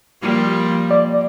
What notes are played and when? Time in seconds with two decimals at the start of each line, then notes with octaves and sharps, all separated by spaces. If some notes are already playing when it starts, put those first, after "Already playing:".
0.22 F3 G3 A#3
0.91 D5